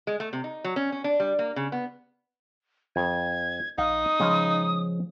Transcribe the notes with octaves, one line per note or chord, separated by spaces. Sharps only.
G#3
A3
C3
D#4
F#3
C#4
C#4
D4
G3
A#3
C#3
B3
F2 G#6
A#1 D#4 F5 D#6
C#3 F3 G#3